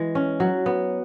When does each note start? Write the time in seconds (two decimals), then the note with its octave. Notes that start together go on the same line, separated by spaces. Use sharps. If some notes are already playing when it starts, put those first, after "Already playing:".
Already playing: E3 G#3
0.15 C#4
0.40 F#3
0.66 B3